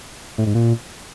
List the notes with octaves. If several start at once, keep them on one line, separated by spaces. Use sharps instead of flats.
A2
G#2
A#2